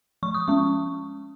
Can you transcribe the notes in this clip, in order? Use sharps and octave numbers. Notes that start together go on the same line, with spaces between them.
F3 C#6
D#6
G#3 C#4 C#6